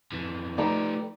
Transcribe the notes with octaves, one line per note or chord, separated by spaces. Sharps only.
F2 E3
F3 A3 D#4 G4 B4 D5 A#5